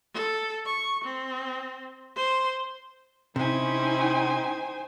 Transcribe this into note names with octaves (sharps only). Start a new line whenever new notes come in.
A4
C#6
C4
C5
C3 C#4 D#4 E4 C5 G5 G#5